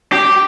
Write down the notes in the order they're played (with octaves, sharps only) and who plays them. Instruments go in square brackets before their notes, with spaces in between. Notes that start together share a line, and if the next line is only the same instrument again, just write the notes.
[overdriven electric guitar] G4